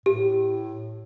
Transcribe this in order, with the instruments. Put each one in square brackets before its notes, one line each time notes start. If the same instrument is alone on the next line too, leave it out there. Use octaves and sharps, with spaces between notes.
[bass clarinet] A2 [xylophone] G4